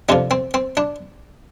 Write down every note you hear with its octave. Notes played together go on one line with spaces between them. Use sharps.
F2 C3 F3 D4
C4
C4
D4